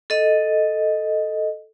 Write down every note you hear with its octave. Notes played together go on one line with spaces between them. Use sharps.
A4 D#5